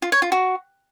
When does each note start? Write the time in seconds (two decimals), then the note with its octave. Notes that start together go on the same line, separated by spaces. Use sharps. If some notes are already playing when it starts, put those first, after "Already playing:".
0.02 F4
0.12 C#5
0.22 F4
0.32 F#4